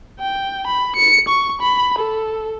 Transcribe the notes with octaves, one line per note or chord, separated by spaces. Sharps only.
G5
B5
C#7
C#6
B5
A4